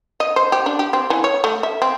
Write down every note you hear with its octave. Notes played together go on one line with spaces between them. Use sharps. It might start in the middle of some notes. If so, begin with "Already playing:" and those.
D#5
C5
G4
D4
G4
C4
E3
C#5
A3
E5
C4